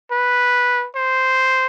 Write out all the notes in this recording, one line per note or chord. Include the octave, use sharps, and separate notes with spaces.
B4
C5